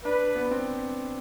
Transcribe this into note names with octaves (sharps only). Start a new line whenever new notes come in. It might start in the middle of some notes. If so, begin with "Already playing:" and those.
D4 B4
B3
C4